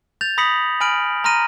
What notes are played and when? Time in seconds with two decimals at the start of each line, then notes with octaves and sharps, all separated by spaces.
0.21 G6 A6 F7
0.38 B5 D#6 A#6 B6 C#7 F#7
0.81 G#5 B5 F6 D7 F#7
1.24 A#5 C6 F6 A#6 D#7